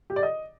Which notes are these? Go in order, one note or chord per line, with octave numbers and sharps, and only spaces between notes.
G4
D5
D#5